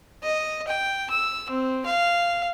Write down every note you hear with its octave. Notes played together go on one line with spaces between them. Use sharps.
D#5
G5
E6
C4
F5